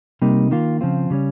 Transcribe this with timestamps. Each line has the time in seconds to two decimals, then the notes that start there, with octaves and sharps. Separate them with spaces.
0.22 C3 G3 A#3 D#4
0.51 D#3 A#3 F4
0.81 C#3 F3 C4 F4
1.10 C#3 G3 C#4